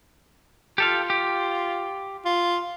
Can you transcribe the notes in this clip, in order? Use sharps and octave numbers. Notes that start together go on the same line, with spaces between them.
F4 G4 A4 F5
G4
F4